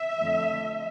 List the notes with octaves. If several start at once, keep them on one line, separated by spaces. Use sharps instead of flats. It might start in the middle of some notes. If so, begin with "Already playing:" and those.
Already playing: E5
F2 D3 A3